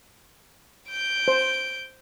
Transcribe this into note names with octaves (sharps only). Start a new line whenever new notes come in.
G6 D7
C5